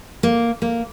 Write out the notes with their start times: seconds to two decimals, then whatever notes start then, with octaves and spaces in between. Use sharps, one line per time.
0.23 A#3
0.62 A#3